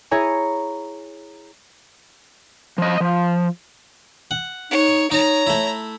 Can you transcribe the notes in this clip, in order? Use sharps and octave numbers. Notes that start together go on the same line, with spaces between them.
E4 G#4 C#5 G#5 A#5 C#6
F3 D#5
F3
F#5
D#4 C#5
D#4 C#5 A#5
A3 E4